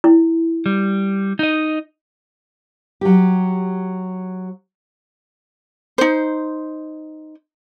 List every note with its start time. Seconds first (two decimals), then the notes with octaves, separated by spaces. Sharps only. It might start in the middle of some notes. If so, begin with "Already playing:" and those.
0.04 E4
0.66 G3
1.39 D#4 D#5
3.01 F#3 G4
5.98 D#4 C5